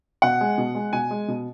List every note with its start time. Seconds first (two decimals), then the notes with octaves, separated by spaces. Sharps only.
0.22 B2 F#5
0.41 G#3
0.58 B2
0.75 G#3
0.93 B2 G#5
1.11 G#3
1.28 B2